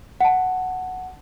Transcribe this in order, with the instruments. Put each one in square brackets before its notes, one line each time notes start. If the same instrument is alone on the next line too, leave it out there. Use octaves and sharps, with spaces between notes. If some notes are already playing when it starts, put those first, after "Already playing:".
[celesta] F#5 A5